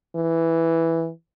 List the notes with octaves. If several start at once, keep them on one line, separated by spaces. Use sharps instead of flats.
E3